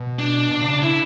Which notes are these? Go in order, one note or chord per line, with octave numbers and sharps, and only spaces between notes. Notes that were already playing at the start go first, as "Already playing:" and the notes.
Already playing: B2
D4
B2
C#3
C#3
D3 E4